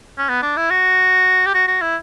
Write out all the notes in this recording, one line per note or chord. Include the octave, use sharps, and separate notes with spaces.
C#4
B3
D4
E4
F#4
G4
F#4
F#4
E4